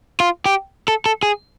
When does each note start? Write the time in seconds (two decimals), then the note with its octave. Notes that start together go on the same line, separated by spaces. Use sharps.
0.20 F4
0.46 G4
0.88 A4
1.06 A4
1.23 G#4